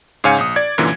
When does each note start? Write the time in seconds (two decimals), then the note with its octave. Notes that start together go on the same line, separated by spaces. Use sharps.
0.24 G#2 C#3 C#5 F5 G#5 C#7
0.38 A#1 D#6
0.56 D5 G#6
0.78 F#2 A#2 D3 E3